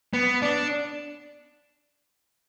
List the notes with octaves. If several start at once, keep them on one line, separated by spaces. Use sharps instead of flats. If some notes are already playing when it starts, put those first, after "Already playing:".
B3
D4